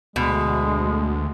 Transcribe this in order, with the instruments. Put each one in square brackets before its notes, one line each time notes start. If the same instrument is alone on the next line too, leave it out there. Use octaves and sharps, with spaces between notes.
[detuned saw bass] D2 [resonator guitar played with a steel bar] B2 [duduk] G#3